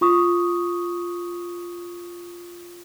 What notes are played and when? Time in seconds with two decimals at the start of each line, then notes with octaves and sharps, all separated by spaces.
0.01 F4 C#6 D#6